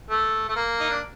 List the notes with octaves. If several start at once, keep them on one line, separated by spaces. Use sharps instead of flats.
A3
A3
A#3
D#4
D4